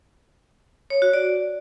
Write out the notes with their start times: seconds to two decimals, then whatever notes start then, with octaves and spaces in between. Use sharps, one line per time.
0.90 C#5
1.02 F#4
1.13 D5